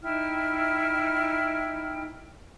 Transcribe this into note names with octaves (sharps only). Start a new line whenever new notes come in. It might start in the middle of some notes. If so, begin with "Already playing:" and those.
D#4 E4 G5 F6